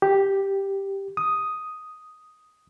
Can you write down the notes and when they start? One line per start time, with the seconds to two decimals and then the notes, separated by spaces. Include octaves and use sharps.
0.02 G4
1.17 D#6